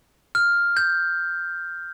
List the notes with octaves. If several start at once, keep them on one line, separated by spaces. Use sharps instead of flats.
F6
G6